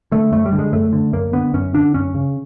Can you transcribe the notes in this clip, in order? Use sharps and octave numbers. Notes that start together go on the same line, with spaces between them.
D3 A3
F#2 A3
G3
D3
G#3
F#2 A3
D3
F#2 A#3
D3 B3
F#2 C#4
D3 D4
F#2 C#4
C#3